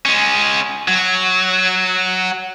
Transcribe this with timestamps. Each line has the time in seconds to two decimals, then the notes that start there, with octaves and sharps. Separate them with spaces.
0.06 G#3 C#4
0.88 F#3